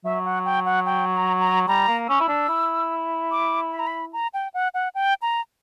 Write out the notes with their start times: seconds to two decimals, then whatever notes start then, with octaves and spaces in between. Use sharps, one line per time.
0.05 F#3 E5
0.25 F#5
0.45 G5
0.66 F#5
0.86 G5
1.14 A#5
1.40 A#5
1.67 G3 A#5
1.88 A#3
2.08 C#4 E6
2.21 E4
2.29 D4
2.49 E4
3.31 D6
3.72 B5
3.79 A#5
3.87 B5
4.13 A#5
4.34 G5
4.54 F#5
4.74 F#5
4.95 G5
5.22 A#5